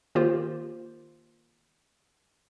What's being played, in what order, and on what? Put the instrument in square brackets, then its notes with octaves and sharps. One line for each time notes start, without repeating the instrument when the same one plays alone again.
[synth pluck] D#3 A#3 F4 G4 C5